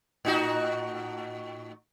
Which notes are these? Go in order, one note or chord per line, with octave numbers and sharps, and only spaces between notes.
A2 D#4 F#4